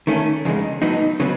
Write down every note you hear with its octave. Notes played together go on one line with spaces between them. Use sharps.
D#3 A3 C#4
E2 C#3 G#3
A2 F#3 B3 D#4
C#3 F#3 B3